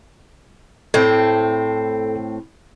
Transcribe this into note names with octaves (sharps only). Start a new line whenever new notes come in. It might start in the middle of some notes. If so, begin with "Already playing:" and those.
A2 C4 A4